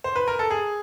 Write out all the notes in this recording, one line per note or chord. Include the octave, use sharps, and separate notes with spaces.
C5
B4
A#4
A4
G#4